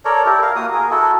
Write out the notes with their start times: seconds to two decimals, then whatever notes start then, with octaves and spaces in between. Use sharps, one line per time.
0.05 A4 A#4 C#5 D5
0.26 E4 G4 A#4
0.42 A#4 F5
0.56 A#3 F#4 D#6
0.73 G#4 A#4
0.91 E4 F#4 A4